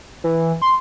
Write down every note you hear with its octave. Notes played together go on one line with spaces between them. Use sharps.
E3
C6